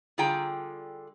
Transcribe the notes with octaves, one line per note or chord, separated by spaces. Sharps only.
D3 G3 F4 G#4 G5 A#5